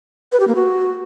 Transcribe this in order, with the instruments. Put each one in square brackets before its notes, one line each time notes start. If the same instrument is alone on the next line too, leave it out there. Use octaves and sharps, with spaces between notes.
[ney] B4
G4
A#3
F#4